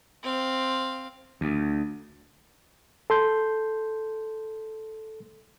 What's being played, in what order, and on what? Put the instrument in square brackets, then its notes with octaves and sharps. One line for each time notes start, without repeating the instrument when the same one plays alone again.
[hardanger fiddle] C4 F5
[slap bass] D2
[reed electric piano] A4 C6 G6